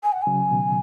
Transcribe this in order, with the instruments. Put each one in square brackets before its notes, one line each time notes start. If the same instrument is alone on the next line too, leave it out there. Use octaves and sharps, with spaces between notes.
[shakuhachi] G#5
F#5
G#5
[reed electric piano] C#3 F#3
B2 D#3